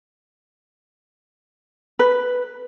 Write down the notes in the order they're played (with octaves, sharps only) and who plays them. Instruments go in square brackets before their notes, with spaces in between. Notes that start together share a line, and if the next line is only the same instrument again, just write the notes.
[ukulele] B4